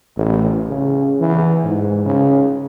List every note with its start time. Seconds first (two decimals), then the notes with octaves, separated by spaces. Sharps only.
0.16 A1
0.69 C#3
1.20 E3
1.64 G#2
2.05 C#3